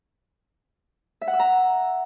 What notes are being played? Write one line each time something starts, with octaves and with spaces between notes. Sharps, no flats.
E5
F#5
E6
A#5